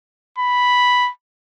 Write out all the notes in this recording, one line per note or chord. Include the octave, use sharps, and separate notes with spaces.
B5